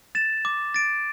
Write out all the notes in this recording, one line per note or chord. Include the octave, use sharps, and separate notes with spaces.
A6 E7
D6
A6 D7